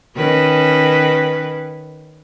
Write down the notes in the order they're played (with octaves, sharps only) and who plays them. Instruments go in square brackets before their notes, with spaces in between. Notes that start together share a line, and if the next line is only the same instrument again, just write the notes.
[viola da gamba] D#3 C#4 B4